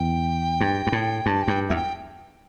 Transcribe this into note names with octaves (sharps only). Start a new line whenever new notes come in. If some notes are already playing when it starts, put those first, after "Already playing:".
Already playing: E2 G5
G2
G2
A2
G2 A5
G5
G2
E2 E5
G5